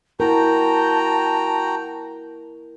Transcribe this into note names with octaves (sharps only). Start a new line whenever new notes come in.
E4 F#4 A#4 G5 A5 A#5